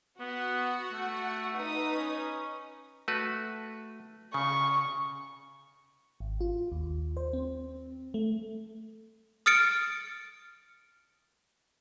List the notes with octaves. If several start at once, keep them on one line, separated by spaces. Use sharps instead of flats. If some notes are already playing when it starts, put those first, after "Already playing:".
B3 F#4 F#5
A3
D#4 B4 D#6
C#4
A3 F#4 B4
C#3 C#6
G#1
F4
D#2
C5
C4
A3
D#6 F6 A6 C#7 D7